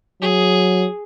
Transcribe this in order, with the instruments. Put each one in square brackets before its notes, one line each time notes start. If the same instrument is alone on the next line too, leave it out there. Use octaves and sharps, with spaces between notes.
[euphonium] F#3 [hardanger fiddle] G#4